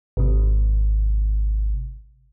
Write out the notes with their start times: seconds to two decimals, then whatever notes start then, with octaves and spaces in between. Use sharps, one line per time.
0.17 G#1 C3